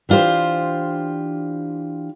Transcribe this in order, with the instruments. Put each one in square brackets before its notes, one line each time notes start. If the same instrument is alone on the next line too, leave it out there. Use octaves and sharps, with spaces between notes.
[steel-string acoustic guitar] E3 D4 F4 G4 C5